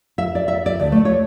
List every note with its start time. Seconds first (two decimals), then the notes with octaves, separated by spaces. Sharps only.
0.18 E5
0.35 D5
0.48 E5
0.66 D5
0.80 D2
0.92 A3
1.05 C#5